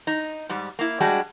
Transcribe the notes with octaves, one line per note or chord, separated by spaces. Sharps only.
D#4
G#2 G3
A#3 E4
G3 G#3 D4 F#4